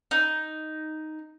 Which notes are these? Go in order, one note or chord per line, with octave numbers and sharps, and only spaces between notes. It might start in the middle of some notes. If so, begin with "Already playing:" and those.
D#4